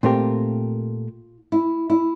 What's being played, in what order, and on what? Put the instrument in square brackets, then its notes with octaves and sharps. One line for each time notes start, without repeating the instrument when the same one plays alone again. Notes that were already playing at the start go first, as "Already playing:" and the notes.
[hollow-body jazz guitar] A#2 A3 C4 G4 A#4 [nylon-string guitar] F4
[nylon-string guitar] E4
E4